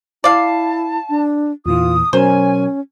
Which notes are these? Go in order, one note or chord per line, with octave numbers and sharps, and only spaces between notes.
E4 D5 F5 A5
D4
E2 A#2 E3 F4 D#6
B2 F#3 C#4 A#4 C5 G#5